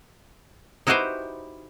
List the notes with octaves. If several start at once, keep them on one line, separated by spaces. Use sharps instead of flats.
D#4 E4 F#4 G4 B4 C5